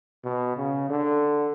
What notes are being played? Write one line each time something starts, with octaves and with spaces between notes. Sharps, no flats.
B2
C#3
D3